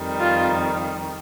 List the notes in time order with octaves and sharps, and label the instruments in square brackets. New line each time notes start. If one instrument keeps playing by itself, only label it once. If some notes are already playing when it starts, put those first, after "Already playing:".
Already playing: [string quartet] F2 D#3 G3
[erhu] F4